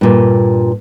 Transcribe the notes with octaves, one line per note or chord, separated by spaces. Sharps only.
G2 A#2